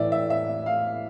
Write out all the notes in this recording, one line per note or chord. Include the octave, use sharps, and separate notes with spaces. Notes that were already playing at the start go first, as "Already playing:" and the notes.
Already playing: A2 E3 D5 E5
E5
E5
F5